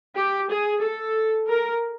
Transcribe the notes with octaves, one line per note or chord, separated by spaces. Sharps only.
G4
G#4
A4
A#4